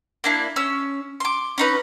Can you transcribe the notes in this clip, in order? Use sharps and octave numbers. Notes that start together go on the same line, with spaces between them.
A#3 D4 E4
C#4 E6
C6 D6
C#4 D#4 B4